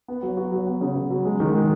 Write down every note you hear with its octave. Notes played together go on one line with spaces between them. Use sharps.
B3
F#3
F#4
F#3
B3
C#3
C#3
F#3
G#3
D#3
G#3